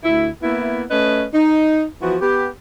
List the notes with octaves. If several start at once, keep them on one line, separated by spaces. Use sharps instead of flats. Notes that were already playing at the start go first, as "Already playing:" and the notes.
D2 E4
A#3 B3 E4
A3 C#4 B4 D#5
D#4
E3 F3 B3 F#4
B3 G4